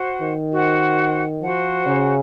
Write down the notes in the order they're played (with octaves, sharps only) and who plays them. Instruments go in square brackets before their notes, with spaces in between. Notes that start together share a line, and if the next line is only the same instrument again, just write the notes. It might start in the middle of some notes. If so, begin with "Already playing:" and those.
Already playing: [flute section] F#4 C5 F#5
[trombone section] D#3
[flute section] F#4 C5 F#5
[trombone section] F3 [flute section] F#4 C5 F#5
[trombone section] C#3